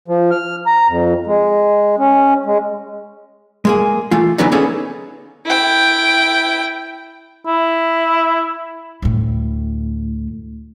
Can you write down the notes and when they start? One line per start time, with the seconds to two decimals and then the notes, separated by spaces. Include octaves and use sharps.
0.08 F3
0.31 F6
0.67 A#5
0.88 F2
1.27 G#3
1.99 C#4
2.46 G#3
3.65 G#3 A#3 G#4
4.11 E3 A3 F4
4.38 D3 E3 F#3 B3 D4 D#4
4.52 A#3 B3 C#4 D#4 G#4 A4
5.45 E4 G5
7.46 E4
9.02 D2 A2